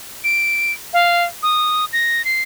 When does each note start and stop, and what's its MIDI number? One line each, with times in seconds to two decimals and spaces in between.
0.24 0.73 98
0.93 1.24 77
1.43 1.85 87
1.93 2.25 94
2.25 2.43 96